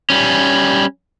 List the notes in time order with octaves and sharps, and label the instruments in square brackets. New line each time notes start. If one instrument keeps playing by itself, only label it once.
[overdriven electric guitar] G3 C#4